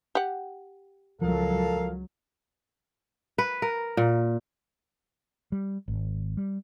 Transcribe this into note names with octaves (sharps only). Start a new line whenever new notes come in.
G4 F#5
C#2 F3 F#3 A4 A#4 F5
B4
A#4
A#2
G3
G#1
G3